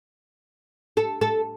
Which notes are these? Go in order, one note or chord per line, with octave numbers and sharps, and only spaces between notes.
A4
A4